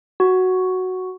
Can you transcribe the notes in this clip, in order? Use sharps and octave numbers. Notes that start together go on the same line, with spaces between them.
F#4